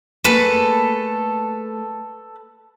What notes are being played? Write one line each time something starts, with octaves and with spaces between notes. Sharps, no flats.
A3 A#3 G#4 A4 B4